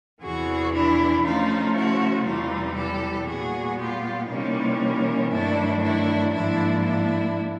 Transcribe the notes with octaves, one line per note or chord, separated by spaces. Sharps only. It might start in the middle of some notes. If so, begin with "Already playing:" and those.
E2 C3 E3 F#4 G#4
D4 E4
C#3 F3 A3 D#4 F4
E4 F#4
E2 C3 E3 G3 D#4 F4
G4 A4
A#2 G3 B3 F#4 G#4
F4 G4
C3 E3 G3 A#3 C#4 D#4
G2 D#3 F#3 A3 D4 E4
D4 E4
G#2 F3 A#3 D4 E4
D4 E4